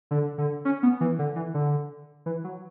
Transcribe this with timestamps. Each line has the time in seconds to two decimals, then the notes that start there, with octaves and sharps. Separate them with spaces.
0.11 D3
0.38 D3
0.65 C#4
0.83 B3
1.01 E3
1.19 D3
1.36 E3
1.54 D3
2.26 E3
2.44 F#3